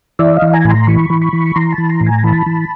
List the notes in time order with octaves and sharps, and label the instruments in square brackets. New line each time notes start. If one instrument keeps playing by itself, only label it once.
[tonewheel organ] E3 D5 E5
D#5 F5
E3
G#5 A#5
A2 B5
A#5 C6
E3 B5 C#6
E3
B5 C#6
E3
E3 A#5 C6
A5 B5
E3
A#5 C6
A2
G#5 A#5
E3 A5 B5
E3